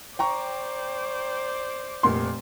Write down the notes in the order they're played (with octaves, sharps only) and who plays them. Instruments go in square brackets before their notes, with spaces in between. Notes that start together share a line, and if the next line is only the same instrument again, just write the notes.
[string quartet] C5 D5 D6 [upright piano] G5 A#5 C#6
[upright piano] F1 A#2 C6